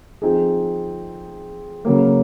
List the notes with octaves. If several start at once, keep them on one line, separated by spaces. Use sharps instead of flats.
F3 C4 D#4 G#4
C#3 F#3 A#3